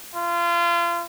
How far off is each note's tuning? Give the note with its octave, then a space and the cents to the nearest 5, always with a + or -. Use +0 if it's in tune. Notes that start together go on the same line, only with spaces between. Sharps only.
F4 -30